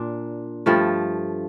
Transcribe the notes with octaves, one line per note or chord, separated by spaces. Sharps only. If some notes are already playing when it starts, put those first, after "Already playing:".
Already playing: A#2 D4
G2 F3 A3